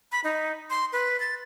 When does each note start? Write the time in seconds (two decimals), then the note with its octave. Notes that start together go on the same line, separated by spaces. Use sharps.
0.12 B5
0.24 D#4
0.70 C6
0.93 B4
1.20 A6